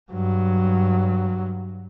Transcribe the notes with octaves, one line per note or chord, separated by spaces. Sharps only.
G2 F#3